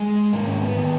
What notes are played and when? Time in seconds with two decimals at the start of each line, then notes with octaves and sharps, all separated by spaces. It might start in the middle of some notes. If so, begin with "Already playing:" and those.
Already playing: G#3
0.33 G#2 D#3 A#3
0.47 C#4
0.61 B3
0.76 D#3